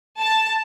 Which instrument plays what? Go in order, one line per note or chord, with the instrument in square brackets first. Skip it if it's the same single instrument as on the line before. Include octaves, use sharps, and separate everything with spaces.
[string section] A5